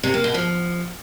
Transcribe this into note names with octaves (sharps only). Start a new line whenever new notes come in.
C3
A#3
B2
F3